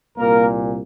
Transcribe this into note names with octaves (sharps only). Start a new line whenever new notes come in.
C2 A#2 A#3 A#4